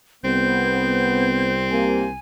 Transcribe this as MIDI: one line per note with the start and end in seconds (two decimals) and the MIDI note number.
0.24 2.18 36
0.24 1.60 59
0.24 2.09 60
0.24 1.53 91
1.70 2.05 48
1.70 2.05 58
1.70 2.19 80